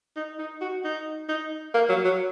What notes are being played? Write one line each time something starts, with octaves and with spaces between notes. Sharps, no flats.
D#4
D#4
F#4
D#4
D#4
A#3
F#3
F#3